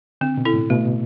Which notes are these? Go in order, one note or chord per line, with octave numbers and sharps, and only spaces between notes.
D3 C4
B2
E4 A4
A2
B2 A3